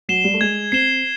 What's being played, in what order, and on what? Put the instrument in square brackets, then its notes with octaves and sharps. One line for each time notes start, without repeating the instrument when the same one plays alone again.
[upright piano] F#3 [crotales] C7 E7 G7
[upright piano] G3
A3
[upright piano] G#3 [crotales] G#6
[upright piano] C4 [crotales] C7 E7 G7